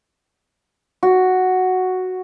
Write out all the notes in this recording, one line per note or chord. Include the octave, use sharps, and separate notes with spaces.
F#4